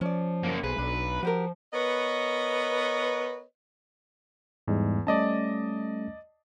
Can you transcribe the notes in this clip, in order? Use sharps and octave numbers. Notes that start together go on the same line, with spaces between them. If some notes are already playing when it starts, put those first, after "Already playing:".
F3 C#4 D5
F#2 A#3
B1 G#4 B4 C5
B1 D4
F3 F#4 G4 A#4
B3 A#4 B4 C#5 D#5
E2 G#2 G3 G#3
G3 A3 C#4 D5 D#5 A5